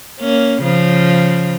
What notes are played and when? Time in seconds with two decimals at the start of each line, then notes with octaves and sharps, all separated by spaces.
0.21 A#3 C#4
0.63 C#3 F3